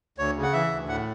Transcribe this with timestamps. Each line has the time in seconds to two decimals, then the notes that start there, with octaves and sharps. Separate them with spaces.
0.18 D2 C#5
0.36 C#3
0.43 F#5
0.53 E3 E5
0.71 D2
0.88 A2 F#5